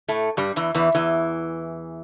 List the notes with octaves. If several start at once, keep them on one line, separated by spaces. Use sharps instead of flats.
A2 A3
G2 G3
E2 E3
E2 E3
E2 E3